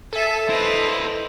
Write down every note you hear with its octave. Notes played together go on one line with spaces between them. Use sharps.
A4 E5 G#5
E4 B4 C5 D#5